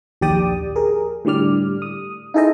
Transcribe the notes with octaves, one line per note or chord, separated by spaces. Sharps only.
A#1 D#2 G4 D5 G5 D#6
G#4 A#4
A2 D3 G3 D5 F6
D#6
D#4 E4 G#4 A4 C5 D#5